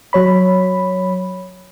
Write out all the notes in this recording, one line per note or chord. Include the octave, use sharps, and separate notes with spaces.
F#3 C#5 B5